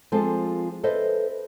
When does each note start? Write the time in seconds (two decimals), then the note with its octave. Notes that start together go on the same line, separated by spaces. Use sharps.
0.12 F3 G#3 C4 F4 A4
0.83 A4 B4 C5 D#5 E5